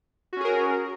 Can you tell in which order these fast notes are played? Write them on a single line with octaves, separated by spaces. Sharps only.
F#4 C#4 G#4 A#4